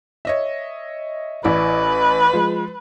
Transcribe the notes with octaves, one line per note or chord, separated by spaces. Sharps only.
C#5 D#5 E5
A1 E4 B4 D5
F3 G#3